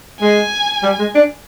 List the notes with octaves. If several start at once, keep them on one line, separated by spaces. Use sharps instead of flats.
G#3 G#5
G3
G#3
D4